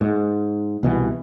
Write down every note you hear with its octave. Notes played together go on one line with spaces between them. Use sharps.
G#2
C2 B2 E3